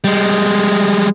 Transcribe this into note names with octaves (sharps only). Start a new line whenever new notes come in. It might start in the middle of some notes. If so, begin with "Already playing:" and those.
G3 G#3